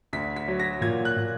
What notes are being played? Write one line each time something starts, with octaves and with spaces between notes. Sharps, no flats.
D2 B6
B6
F#3
A#6
A#2 G#6
F#6
A#2